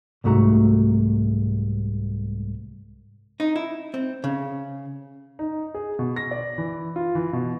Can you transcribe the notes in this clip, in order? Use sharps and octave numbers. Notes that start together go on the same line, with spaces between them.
C2 G#2 A3 F#4 A#5
D#4
E4
C4
C#3
D#4
G#4
B2
A#6
D5
E3
F4
E3
B2